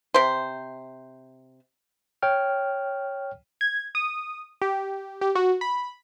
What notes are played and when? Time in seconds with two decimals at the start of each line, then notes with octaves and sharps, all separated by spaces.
0.14 C3 C5
2.22 C#5 G5 F6
3.61 G#6
3.95 D#6
4.62 G4
5.21 G4
5.35 F#4
5.61 B5